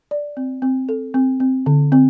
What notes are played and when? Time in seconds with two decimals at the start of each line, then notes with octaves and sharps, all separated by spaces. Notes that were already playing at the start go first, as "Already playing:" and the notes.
0.11 D5
0.37 C4
0.62 C4
0.89 A4
1.14 C4
1.40 C4
1.66 D3
1.92 C4